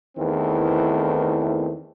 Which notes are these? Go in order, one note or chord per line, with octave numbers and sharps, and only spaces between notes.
E2 D#3 E3 A3 C4